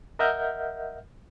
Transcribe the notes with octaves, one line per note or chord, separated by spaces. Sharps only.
A#4 D#5 E5 F#5 F6 G6